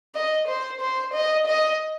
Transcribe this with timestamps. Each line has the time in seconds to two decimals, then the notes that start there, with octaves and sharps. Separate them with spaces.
0.15 D#5
0.48 C5
0.81 C5
1.13 D#5
1.47 D#5